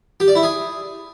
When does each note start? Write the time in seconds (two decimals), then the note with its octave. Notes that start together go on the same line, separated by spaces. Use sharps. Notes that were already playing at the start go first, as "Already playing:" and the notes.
0.20 G4
0.28 D5
0.35 E4
0.43 G#4